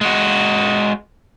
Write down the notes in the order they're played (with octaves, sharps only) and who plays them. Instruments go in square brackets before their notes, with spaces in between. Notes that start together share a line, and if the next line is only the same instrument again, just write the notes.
[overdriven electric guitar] G#3 F#4